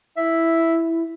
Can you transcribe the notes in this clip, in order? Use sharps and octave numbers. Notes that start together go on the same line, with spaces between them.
E4 E5